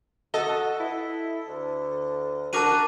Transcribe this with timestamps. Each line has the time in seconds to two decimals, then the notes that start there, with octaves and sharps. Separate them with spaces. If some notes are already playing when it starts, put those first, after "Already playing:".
0.34 F#4 A4 D#5 G7
0.80 E4
1.48 D2
2.53 D4 F#4 A#4 A5 D6 D#7